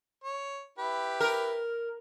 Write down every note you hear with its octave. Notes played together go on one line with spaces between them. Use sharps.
C#5
E4 G4 B4
A#4